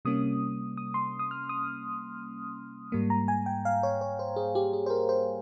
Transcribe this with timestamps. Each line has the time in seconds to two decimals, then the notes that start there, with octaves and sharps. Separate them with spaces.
0.05 C3 G3 A#3 C#4 D#6
0.77 D#6
0.94 C6
1.19 D#6
1.31 F6
1.49 D#6
2.92 G#2 G3 A#3
3.10 A#5
3.28 G#5
3.46 G5
3.65 F5
3.83 C#5
4.01 C#5
4.19 C5
4.36 G#4
4.55 G4
4.73 G#4
4.86 C5
4.90 A#4
5.09 C5